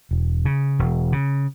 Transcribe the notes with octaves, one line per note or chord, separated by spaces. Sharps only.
E1
C#3
E1
C#3